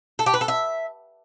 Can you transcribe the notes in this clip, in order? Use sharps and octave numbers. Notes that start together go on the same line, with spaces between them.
A4
G4
B4
A4
E5